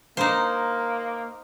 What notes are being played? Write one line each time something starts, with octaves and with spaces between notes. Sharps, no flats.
A#3 D#4 C5